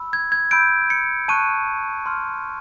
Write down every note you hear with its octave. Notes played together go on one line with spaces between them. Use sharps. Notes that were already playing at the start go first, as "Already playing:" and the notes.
Already playing: B5 E6
G#6
G#6
B5 E6 G6 D7
C#7
A5 C#6 F#6 D#7
C6 F6